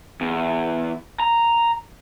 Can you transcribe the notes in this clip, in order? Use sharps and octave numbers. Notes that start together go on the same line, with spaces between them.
E2
A#5